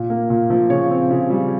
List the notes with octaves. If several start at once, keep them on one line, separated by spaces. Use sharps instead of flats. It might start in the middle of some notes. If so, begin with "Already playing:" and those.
Already playing: A#2
A#3
A#2
F3
C#3 C#5
C4
C#3
G3